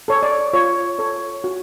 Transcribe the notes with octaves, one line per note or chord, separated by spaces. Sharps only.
A4 C#5
D5
F4 C#5
A4 C#5
F#4